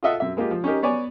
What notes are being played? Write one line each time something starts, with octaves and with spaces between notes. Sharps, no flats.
F4 A4 D#5 E5 F#5
F#2 E5
G#3 A#3 F4 G4
F3
C#4 D#4 G4 A#4
B3 C#5 D5 G#5